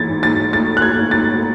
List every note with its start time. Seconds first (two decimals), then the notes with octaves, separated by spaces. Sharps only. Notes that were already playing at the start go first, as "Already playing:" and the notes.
Already playing: E3 G#6 A6
0.09 G#2
0.23 A6
0.53 A3 A6
0.77 F#6
0.82 G#6
0.97 G#2
1.11 A6